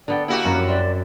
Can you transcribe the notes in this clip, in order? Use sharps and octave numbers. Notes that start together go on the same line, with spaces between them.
D3 B3 D5 G5
A#3 E4 F#4 G4
F#2 C#4 A#4
C4 D5 E5